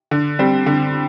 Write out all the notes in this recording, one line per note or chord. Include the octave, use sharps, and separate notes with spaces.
D3
G3 C4
D3